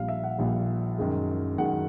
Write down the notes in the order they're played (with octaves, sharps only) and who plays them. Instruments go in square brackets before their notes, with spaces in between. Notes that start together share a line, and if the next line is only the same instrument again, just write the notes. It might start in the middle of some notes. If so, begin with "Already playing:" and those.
Already playing: [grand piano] A#1 A#2 G3 F5
E5
F#5
A#1 A#2 G3
F#2 D#3 G#3
F#2 D#3 G#3 F#5